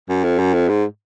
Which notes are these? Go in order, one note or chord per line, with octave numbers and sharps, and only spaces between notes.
F#2
F2
F#2
F2
G#2